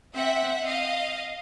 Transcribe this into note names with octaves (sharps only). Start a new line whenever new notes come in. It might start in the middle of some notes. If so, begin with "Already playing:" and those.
C4 E5 F#5
D#5 F5